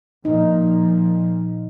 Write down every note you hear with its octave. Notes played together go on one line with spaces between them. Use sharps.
A#2 F3 D#4